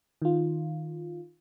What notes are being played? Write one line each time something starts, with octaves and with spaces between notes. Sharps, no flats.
D#3 F4